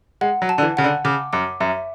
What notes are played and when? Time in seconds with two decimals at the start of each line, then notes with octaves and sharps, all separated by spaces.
0.21 G#3 F#5
0.42 F#3
0.49 A5
0.58 D3
0.63 E3
0.77 C#3 F#5
0.84 D3
1.05 C#3 D6
1.33 F#2 D6
1.60 F#2 E5